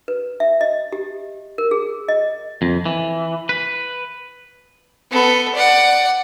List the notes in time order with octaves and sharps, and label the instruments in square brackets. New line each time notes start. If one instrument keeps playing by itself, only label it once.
[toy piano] B4
E5
D#5
G4
A#4
G#4
D#5
[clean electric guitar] F2
E3
B4
[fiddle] B3 A4
D5 F#5